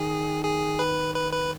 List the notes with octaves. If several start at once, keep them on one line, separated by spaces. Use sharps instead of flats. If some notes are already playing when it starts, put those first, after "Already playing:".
Already playing: D#3 G#4
G#4
B4
B4
B4